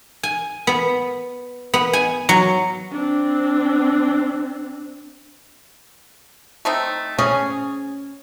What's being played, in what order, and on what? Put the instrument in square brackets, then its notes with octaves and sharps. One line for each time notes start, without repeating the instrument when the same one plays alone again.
[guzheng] G#5
B3
B3
G#5
F#3
[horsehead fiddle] C4 D4
[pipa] A3 C4 D#4
[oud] C#4 [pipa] G#4